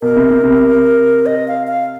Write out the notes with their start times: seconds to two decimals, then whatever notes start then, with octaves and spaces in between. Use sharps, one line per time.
0.02 B2 A#4
0.16 C3
0.30 C3
0.44 C3
1.26 D#5
1.48 F5
1.67 F5